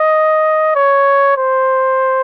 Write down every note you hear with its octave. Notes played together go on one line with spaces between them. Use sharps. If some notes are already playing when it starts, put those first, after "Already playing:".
Already playing: D#5
C#5
C5